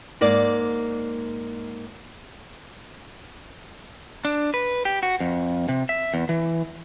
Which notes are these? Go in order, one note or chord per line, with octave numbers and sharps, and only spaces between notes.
G#2 A#3 D5
D4
B4
G4
F#4
F2
C3
E5
E2
E3